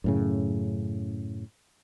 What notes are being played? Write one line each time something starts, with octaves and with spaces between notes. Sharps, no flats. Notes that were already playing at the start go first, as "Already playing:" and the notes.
F#2 A2 C#3